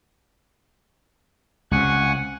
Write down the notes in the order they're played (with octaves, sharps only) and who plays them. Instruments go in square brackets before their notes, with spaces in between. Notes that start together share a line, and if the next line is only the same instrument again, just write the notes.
[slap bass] C#2 C3 [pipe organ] F#5 G#5 C#6